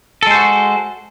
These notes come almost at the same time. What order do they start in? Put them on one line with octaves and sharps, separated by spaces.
A4 G#3 C5 F#4